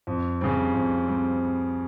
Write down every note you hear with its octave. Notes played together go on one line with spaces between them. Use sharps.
F2
C#3 G3 C4
F2
G3 C4